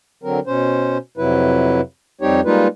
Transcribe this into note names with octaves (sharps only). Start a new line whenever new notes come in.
D3 F#3 C4 A#4
B2 C#4 C5
F2 C3 F#3 E4 B4
F2 G3 C4 D#4 G4 C#5
G3 G#3 A#3 D#4 F4 B4